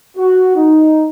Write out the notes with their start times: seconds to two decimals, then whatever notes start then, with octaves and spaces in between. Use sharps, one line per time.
0.17 F#4
0.56 D#4